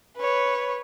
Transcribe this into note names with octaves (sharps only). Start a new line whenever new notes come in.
B4 C#5